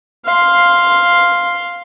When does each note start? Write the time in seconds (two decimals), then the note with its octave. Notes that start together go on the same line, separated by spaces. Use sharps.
0.25 F5 C6